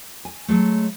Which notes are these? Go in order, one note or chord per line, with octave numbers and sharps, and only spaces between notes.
G#5
F#3 G#3 A3